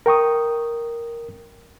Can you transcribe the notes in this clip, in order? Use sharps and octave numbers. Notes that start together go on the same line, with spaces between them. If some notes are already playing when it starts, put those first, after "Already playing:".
A#4 G5 C#6 D#6